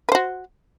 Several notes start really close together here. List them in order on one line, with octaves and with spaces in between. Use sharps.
B4 C5 F#4